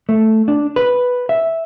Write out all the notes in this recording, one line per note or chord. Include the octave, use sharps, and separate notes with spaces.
A3
D4
B4
E5